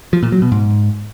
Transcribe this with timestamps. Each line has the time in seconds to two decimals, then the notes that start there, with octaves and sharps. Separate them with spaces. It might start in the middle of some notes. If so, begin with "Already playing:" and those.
0.13 F3
0.23 A#2
0.32 F#3
0.42 B2
0.52 G#2